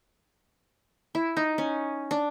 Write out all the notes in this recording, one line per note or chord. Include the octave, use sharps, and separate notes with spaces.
E4
D#4
C#4
D4